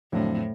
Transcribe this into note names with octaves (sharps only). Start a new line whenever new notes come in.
F2 A2 D3 F#3